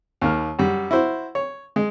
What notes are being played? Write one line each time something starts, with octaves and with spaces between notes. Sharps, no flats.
D#2 A#3 F6
F#2 G3
E4 F#4 C5
C#5
G#3